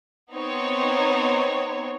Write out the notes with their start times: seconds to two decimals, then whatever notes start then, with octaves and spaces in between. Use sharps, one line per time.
0.33 B3 C4 D#4 C#5